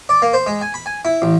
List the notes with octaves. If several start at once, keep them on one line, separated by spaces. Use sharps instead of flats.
D5
A#3
C5
G#3
G#5
B5
G#5
E4
A1